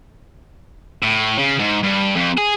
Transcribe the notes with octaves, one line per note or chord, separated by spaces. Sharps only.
A2
C#3
G#2
G2
F2
G#4